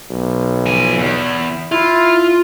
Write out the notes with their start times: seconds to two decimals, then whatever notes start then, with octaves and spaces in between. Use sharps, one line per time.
0.11 B1
0.66 F3 G#5
0.98 E2
1.72 E4 F4